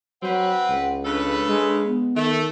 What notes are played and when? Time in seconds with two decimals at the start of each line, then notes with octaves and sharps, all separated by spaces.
0.23 F#3 C4 B4 F#5
0.69 C#2
1.05 C#3 D4 A4 B4
1.48 G#3
1.87 B3
2.16 D#3 A3